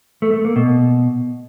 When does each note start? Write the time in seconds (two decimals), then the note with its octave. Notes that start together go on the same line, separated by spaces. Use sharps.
0.22 A3
0.33 A3
0.45 A#3
0.56 B2